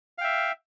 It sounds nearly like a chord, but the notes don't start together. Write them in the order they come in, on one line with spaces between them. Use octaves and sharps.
F5 G5 E5